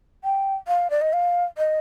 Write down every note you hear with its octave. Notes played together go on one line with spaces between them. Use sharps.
G5
F5
D5
D#5
F5
D#5